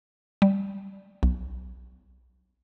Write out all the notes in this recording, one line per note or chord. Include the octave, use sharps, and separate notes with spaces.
G3
B1